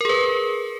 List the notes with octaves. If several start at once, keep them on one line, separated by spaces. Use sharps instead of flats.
G#4 A#4 B4